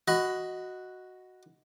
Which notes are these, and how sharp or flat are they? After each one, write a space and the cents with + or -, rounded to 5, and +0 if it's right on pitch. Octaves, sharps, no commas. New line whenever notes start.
F#4 +0 D#5 +5 B5 +20